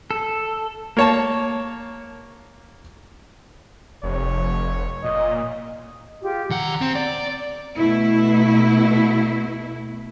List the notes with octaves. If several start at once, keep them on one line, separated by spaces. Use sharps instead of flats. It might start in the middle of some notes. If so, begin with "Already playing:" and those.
A4
A#3 C#5 A5
F1 C#5
A#2 D#5
F4 G4 G#4
D#3 F#5 A#5
C4
D5
B2 A3 E4